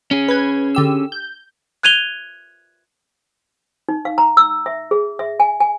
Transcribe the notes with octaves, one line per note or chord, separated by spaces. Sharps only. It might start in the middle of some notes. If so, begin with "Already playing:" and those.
C#4 G#4
B4 G#6
D3 G4 E6
G6
F#6 G#6 D#7 F7 G7
D#4
F5
A#5
E6
E5
G#4
E5
G#5
G#5